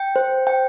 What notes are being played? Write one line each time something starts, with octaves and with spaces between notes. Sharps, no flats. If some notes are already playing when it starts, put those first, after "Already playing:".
Already playing: G5
C5
G5